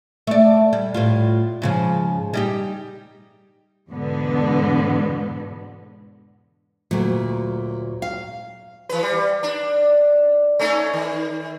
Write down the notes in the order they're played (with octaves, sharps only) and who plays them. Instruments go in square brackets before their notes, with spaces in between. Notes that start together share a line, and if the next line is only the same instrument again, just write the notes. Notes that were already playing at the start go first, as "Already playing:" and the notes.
[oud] A3 D5
G3
A2 G3 F4
G#2 C#3 F3
G3 D#4 G4
[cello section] E2 G#2 B2 D3 B3
[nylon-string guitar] D2 A#2 [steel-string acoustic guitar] F#3
[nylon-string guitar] F5
[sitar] E3 B4
G3
D4
A3 C#4 D#4
D#3